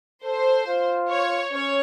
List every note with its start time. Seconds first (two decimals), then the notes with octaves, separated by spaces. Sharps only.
0.24 A4 C5
0.67 F4
1.10 C#5
1.52 C#4 C#5